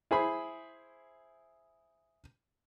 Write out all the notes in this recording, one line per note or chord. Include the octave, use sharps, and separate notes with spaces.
E4 G#4 C5 B5